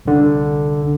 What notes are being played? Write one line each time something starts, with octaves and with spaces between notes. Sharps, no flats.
C2 D3